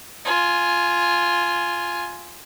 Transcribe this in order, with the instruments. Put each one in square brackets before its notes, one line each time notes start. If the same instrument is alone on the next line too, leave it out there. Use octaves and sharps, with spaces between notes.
[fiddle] F4 G#5